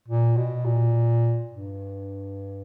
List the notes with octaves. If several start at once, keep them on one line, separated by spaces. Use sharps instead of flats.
A#2
B2
A#2
G2